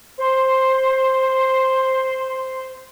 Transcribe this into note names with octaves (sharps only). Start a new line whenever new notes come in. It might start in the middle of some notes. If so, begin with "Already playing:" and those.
C5 C6